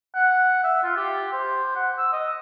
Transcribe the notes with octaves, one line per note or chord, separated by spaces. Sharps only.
F#5
E5
F4
G4
C5
F#5
E6
D#5